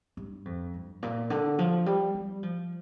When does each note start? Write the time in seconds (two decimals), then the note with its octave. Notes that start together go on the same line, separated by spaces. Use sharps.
0.17 G2
0.45 F2
0.74 G2
1.03 A#2
1.30 D3
1.59 F3
1.86 G3
2.15 G3
2.43 F3